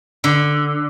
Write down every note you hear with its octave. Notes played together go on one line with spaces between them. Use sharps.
D3